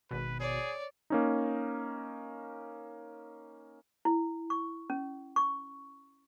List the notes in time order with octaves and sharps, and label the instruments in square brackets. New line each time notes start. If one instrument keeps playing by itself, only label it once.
[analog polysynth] G#1 B2 [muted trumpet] B4
[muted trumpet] G#4 [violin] C#5 D5
[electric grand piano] A#3 C#4 D#4
[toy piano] E4
C#6
C#4
C#6